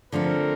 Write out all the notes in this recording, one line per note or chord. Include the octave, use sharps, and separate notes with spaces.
D3 F3 A3 C4 A#4